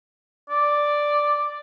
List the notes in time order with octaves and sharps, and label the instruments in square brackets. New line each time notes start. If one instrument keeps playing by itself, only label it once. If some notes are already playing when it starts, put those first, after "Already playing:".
[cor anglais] D5